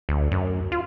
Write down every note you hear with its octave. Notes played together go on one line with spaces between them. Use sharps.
D2
F#2
F4